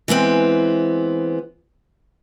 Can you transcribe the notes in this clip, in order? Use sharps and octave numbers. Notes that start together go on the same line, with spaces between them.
E3 G#3 B3 C4